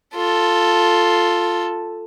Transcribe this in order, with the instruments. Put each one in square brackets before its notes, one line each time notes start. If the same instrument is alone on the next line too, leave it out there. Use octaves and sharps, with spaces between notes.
[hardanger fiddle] F4 A4